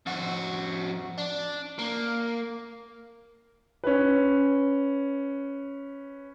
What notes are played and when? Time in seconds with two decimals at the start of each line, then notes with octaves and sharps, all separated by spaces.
0.06 F2 F#4
1.18 D4
1.79 A#3
3.84 C#4 B4